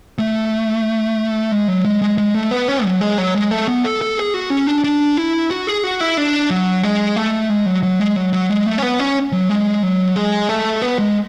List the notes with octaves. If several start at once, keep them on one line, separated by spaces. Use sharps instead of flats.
A3
G#3
F#3
G#3
G#3
G#3
A3
B3
C#4
F#3
G#3
F#3
G#3
A3
B3
A4
A4
G#4
F#4
C#4
D4
D4
E4
F#4
G#4
F#4
E4
D4
F#3
G#3
A3
G#3
F#3
F#3
G#3
F#3
F#3
G#3
A3
C#4
B3
C#4
F#3
G#3
F#3
G#3
A3
B3
G#3